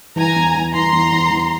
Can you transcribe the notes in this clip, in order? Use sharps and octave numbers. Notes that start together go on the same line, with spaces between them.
E3 G#5 A#5
E2
E2
E3 A#5 C6
E2
E2
E2